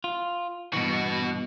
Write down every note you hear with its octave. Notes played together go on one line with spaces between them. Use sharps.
F4
G2 B2 E3 F#4